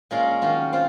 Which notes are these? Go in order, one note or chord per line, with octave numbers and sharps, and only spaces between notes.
A#2 G#3 C#4 F4 A#4
D#3 F#3 C#4 F4
C4 F4